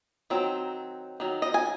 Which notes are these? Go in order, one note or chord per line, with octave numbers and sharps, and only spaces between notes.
D#3 F#3 C4
D#3 F#3
D#5
G#5